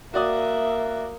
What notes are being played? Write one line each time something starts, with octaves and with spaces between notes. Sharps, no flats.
A#3 F#4 D5 E5 D#6